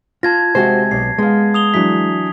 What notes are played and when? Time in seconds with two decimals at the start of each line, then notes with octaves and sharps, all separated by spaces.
0.23 F4 A5 G#6 A#6
0.55 C3 G#3 F#4 C5
0.91 B1 C7
1.18 G#3 B3 F5
1.54 D#6 F7 G7
1.74 E3 F#3 D4 B6